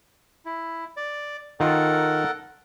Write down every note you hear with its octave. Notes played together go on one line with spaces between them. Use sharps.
E4
D5
D#3 F4 A4 A#4 F#5